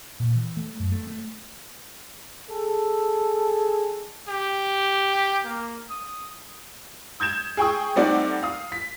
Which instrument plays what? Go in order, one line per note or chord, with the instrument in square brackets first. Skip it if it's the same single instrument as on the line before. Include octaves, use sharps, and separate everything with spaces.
[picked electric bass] A#2
E3
A3
F#2
A3
A3
[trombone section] G#4 A4
[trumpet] G4
A#3
D#6
[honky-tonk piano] D#6 G6 G#6 E7
G#4 G5 C#6 D#6
G3 A3 C4 D#4 D5 F#5
F5 D#6
B6